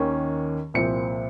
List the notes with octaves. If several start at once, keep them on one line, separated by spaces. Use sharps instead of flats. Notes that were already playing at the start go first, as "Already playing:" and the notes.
Already playing: D#2 D#3 A#3 C#4
C2 A#2 F3 C4 C#7